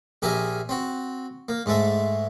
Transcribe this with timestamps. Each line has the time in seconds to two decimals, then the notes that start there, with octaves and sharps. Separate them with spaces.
0.22 A#1 G4 G#4 A#4 E5 G#5
0.69 C4 F#4
1.49 A#3
1.66 G#2 G#3 A3 E5